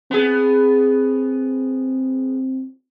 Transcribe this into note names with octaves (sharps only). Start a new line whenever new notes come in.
B3 C4 G#4